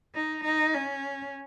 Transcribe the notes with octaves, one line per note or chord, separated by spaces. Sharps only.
D#4
D#4
C#4